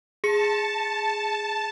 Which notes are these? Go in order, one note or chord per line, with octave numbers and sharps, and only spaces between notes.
G#4 A5 C#7